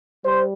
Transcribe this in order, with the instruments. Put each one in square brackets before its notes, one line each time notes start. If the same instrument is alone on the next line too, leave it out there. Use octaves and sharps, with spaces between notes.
[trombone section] G3 C5